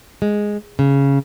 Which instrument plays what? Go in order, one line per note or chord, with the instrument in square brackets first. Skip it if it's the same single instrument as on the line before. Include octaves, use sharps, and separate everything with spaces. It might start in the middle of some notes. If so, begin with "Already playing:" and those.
[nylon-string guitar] G#3
C#3